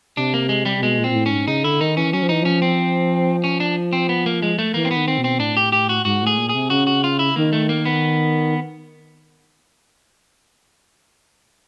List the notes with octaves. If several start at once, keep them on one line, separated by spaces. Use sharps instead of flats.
C3 D4
A#3
G#3
G3
C3
B2 G#3
A#2
C4
A#2
A2
G#2 C#4
C#3 D#4
D3 E4
D#3 D#4
E3 C#4
F#3 C#4
F3
E3 D#4
F3 C#4
C4
C#4
D4
C4
B3
A#3
G#3
A3
E3 A#3
C4
B3
D#3
C4
B2
C4
A2 D4
G4
G4
F#4
G#2 F#4
A2 G#4
A#2
G#4
C3
C#3 F#4
F#4
F4
E4
D#3 A#3
A3
A#3
B3